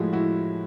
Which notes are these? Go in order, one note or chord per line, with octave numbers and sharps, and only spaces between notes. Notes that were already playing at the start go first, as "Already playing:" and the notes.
Already playing: A2 F3 G#3 E4 F#4
E4 F#4